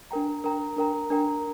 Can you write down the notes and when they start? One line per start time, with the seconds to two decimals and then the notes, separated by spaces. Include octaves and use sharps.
0.11 D4 A#4 G5 A#5
0.44 D4 A#4 G5 A#5
0.77 D4 A#4 G5 A#5
1.10 D4 A#4 G5 A#5